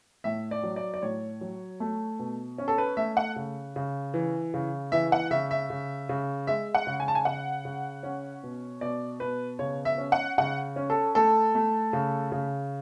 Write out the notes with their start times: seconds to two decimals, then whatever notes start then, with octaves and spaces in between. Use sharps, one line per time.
0.24 A2 E5
0.51 D5
0.63 F#3
0.76 D5
0.94 D5
1.02 A2 C#5
1.41 F#3
1.80 A3
2.19 B2
2.58 C#4
2.68 A4
2.78 B4
2.97 A3 E5
3.17 F#5
3.36 C#3
3.76 C#3
4.14 E3
4.54 C#3
4.92 E3 E5
5.12 F#5
5.31 C#3 E5
5.51 E5
5.70 C#3
6.09 C#3
6.47 G#3 E5
6.74 F#5
6.87 C#3
7.00 G#5
7.08 A5
7.15 G#5
7.25 C#3 F#5
7.65 C#3
8.03 C#4
8.43 B2
8.81 B2 D5
9.20 B2 B4
9.59 C#3 C#5
9.85 E5
9.98 C#4
10.12 F#5
10.38 C#3 F#5
10.76 C#4
10.90 A4
11.15 A3 A4
11.55 A3
11.93 C#3
12.32 C#3